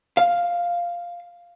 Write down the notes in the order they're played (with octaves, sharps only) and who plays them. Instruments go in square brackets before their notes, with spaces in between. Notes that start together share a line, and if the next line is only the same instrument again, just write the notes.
[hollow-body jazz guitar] F5